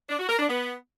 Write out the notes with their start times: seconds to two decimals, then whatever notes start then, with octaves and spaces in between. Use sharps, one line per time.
0.09 D4
0.19 F#4
0.29 A#4
0.39 D4
0.49 B3